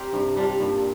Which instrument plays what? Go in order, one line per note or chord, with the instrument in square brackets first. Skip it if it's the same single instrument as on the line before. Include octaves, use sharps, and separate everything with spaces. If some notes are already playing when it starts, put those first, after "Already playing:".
Already playing: [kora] G3 C4 G4 A#4
[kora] G2 [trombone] C3
[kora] G3 D4 F4
[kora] G2 [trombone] A#2